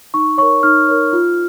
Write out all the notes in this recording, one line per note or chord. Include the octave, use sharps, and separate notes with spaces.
D#4 C#6
A#4 C#5 C#6
D#4 F6
A#4 C#5
F4